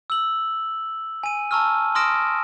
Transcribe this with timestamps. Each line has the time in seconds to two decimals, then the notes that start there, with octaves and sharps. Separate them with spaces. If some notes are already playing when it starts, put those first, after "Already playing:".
0.10 E6 F#7
1.23 G#5 D#7
1.51 A5 A#5 C#6 E6 F6
1.95 C6 D#6 F6 A#6 D7 E7